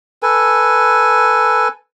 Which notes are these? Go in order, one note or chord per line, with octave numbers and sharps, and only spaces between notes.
A4 B4 G#5